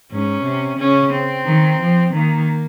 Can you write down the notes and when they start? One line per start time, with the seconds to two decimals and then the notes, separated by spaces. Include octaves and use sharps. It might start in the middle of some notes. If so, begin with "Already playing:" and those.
0.12 G#2 C#4
0.44 C3
0.78 C#3 C#4
1.12 C4
1.46 D#3
1.80 F3
2.13 D#3 A#3